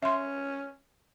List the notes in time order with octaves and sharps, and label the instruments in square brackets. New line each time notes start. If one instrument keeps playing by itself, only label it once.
[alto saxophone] C#4 [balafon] E5 C6